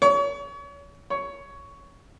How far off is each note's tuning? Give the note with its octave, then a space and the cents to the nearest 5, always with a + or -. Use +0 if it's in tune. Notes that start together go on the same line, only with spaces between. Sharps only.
C#5 +35
C#5 +10